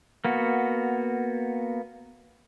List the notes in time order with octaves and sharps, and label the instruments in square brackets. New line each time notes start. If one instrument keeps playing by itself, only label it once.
[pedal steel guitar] A#3 B3 F#4